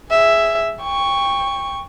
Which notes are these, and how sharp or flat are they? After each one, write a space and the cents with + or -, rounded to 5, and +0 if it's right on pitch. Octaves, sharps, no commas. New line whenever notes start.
G#4 +0 E5 +0
G5 +25 C#6 +0